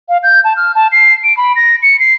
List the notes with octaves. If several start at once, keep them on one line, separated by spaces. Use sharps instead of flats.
F5
G6
A5
F6
A5
C7
D7
B5
A#6
C#7
C7